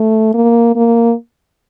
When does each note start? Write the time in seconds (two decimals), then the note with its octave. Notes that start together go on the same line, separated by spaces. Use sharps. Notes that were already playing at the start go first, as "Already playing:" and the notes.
Already playing: A3
0.34 A#3
0.76 A#3